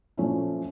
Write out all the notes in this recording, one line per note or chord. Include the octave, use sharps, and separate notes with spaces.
A#2 F3 A3 C#4 E4